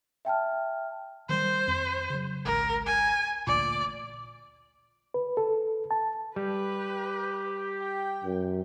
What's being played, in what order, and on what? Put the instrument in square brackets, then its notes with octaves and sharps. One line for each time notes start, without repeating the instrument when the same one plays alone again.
[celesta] E5 G5 A5 F6
[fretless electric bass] D#3 F#3 G3 [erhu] C5
[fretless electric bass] F2
C#3 F#3
[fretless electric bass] G#1 C#2 [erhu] A#4
[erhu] G#5
[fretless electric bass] A1 D2 A#2 [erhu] D5
[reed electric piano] B4
A4
A5
[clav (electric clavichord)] G3 [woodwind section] G4 [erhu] B4
[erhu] G5
[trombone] F#2